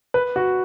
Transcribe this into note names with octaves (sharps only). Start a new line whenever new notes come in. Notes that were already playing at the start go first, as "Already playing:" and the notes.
B4
F#4